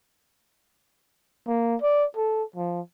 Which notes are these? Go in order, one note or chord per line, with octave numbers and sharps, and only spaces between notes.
A#3
D5
A4
F3